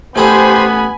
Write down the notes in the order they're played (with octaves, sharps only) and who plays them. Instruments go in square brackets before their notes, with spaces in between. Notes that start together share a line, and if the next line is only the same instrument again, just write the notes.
[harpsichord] A1 A4 D#6 [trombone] B3 [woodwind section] G4 C5 [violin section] G#5 B5